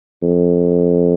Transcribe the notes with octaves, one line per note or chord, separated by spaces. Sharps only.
F2